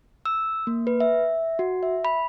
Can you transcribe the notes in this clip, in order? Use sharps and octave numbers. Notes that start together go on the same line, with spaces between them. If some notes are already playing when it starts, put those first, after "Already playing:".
E6
A#3
B4
E5
F#4
E5
B5